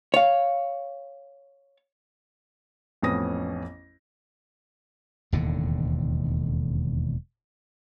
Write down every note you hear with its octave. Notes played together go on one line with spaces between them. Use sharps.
C#5 F5
A1 F2 B3 C#4 D#6 A#6
E1 D#2 A2 D3